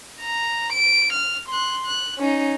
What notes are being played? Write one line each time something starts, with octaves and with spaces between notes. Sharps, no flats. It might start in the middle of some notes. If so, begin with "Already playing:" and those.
A#5
D7
F6
C6 F#6
F#6
C#4 D#4